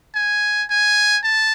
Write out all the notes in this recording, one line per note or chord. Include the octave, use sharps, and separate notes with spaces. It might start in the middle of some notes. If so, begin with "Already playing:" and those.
G#5
G#5
A5